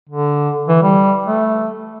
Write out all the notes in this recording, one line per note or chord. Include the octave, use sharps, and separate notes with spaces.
D3
E3
G3
A3